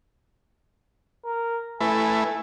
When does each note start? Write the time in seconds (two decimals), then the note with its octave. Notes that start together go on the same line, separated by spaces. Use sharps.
1.26 A#4
1.81 A3 E4 B4 G#5